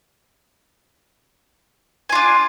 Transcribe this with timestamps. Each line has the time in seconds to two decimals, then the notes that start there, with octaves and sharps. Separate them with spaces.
2.09 G#5
2.12 F4
2.15 D4